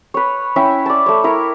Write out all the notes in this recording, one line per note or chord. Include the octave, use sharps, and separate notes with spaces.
B4 C#5
C#4 E4 E5 G5
D5 A5
A3 C#5
E4 A#4 C#5